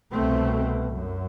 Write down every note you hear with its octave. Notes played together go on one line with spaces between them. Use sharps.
C2 B2 A3 C4
F#2